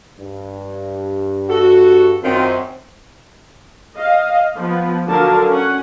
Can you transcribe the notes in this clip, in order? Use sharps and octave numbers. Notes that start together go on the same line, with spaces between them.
G2
F#4 A4
F#2 D#3 C4 F4
D#5 F5
F3 B3
D3 F#3 A#4 F5 A5
C#4 F#5